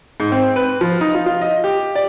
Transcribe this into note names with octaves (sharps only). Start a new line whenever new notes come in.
G#2
C4
B4
F3
D#4
F4
F4
D#5
G4
D5